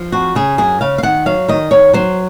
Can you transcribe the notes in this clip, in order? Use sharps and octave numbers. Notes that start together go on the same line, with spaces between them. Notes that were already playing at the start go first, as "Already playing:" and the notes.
Already playing: F3
F2 F#4
C#3 G#4
F#2 G#4
C#3 F5
F5
D#3 F#5
F#3 F5
D#3 D#5
D#3 C#5
F#3 C5